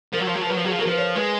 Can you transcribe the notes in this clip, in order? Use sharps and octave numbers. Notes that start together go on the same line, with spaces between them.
F3 A#4
F#3
F3
F#3
F3
B4
F#3
F3
F#3 G#4
F3
F#3
A#4
F3 B4
C#5
G#3 B4